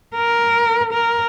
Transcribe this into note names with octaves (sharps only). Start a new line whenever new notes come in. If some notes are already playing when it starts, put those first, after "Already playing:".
A#4
A#4